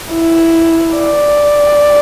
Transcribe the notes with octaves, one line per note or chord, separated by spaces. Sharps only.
E4
D5